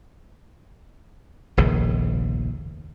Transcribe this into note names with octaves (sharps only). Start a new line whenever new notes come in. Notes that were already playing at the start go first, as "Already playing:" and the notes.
F1 A#1 D#2 C#3